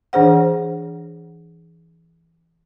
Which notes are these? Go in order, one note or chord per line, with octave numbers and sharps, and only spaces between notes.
E3 D4 G#4 C5 F#5